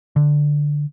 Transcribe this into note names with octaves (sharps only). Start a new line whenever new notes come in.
D3